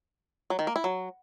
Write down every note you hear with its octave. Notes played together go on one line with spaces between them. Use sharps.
F#3
D#3
A#3
E4
F#3